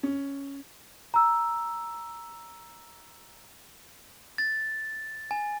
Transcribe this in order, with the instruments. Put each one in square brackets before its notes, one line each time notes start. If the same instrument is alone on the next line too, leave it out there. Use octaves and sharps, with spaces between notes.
[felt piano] C#4
[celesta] A#5 E6
[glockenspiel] A6
G#5